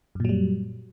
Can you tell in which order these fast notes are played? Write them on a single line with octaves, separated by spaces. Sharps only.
F#2 A#2 F#3 G3